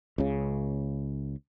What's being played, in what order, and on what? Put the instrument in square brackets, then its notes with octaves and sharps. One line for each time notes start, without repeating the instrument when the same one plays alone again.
[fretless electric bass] C#2 C#3